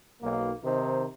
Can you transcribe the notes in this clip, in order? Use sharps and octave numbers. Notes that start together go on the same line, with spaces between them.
B1 A#3
C3 D#3 D#4 C5